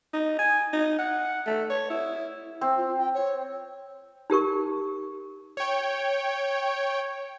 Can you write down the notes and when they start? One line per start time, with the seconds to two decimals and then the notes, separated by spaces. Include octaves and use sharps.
0.14 D#4
0.39 G#5
0.73 D#4
0.99 F#5
1.47 A3
1.70 C#5
1.90 E4
2.61 C4
2.77 F4
2.98 G5
3.14 C#5
4.30 D#4 G4 A#4 C#6
5.57 C#5 G5